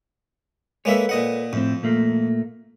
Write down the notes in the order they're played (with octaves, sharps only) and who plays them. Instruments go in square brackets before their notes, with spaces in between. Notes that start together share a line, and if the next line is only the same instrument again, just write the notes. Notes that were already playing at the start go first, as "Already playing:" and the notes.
[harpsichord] G#3 A#3 E5 [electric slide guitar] A4 B4 C#5
[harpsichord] A#2 D#5 F#5
[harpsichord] F2 [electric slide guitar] A2 C4
[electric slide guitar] A#2 A3 A#3